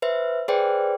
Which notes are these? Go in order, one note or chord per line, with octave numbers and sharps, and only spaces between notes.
B4 C5 E5
G#4 B4 C5 D5 G5